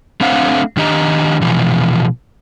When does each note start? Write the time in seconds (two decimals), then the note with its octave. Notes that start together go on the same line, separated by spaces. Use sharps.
0.21 A3 C4 D4 C5 F5 F#5
0.77 D#3 D4 G4 D#5 A#5
1.41 B2 E3 F3